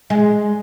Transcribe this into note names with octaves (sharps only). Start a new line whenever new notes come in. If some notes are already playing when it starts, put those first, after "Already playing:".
G#3